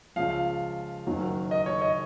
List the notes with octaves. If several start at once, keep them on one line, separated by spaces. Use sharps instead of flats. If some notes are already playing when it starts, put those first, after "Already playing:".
C#2 C#3 F3 F5
F#1 F#2 D#3 F#3
D#5
C#5
D#5